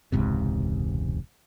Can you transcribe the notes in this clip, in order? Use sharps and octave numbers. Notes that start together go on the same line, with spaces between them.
E1 C#2 G#2 C3